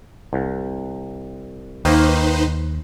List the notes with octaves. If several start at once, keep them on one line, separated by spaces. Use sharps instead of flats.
C2
D#2 D#3 A#3 D#4 B4 C5